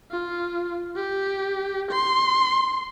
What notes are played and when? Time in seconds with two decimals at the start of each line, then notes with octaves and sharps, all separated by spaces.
0.11 F4
0.96 G4
1.91 C6